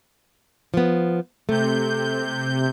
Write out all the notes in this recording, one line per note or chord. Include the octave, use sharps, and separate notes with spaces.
F3 B3
C3 A3 G6